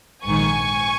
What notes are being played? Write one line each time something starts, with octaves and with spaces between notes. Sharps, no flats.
A#1 G#2 D#3 G#5 C#6